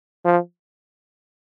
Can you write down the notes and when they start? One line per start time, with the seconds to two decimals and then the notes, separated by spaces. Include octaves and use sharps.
0.25 F3